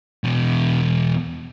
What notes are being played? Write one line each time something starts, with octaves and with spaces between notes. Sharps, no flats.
E2 B2